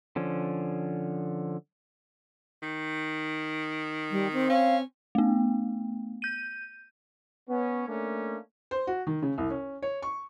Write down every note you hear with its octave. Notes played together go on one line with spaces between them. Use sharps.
D3 F3 C#4
D#3
G3
C4
C#4 F5
A3 B3
G6 D#7
B3 C#4
A3 A#3 C#4 D4
C5
F#4
D#3
C#3
C2
C#4
C#5
C#6